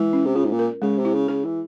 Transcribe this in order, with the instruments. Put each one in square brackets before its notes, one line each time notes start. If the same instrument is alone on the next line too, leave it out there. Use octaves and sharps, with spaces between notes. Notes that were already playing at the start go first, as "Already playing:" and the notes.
Already playing: [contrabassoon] E3 [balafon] G#3
[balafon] C#4
[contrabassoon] C3
[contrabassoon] C#3 [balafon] F4
[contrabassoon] G#2
A#2
[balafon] A#4
[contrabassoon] C#3 [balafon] G#3
[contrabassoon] C3
[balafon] E4
[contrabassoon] C#3
[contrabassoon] C#3 [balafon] G#4
[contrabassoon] E3